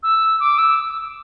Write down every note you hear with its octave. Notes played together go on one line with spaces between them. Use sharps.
E6
D6
E6